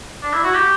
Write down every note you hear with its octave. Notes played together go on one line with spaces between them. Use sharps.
D4
E4
F#4
G4